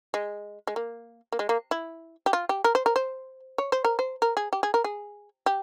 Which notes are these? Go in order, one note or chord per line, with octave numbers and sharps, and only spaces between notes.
G#3
G#3
A#3
A#3
G#3
A#3
E4
G4
F4
G4
A#4
C5
A#4
C5
C#5
C5
A#4
C5
A#4
G#4
G4
G#4
A#4
G#4
G4